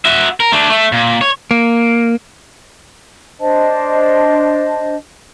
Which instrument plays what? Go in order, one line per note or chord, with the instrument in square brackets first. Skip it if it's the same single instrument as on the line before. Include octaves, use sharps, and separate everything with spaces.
[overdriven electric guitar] F#4 E5
A#4
A3 D4
A3
A#2
C#5
[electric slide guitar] A#3
[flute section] D4 C5 D#5 A5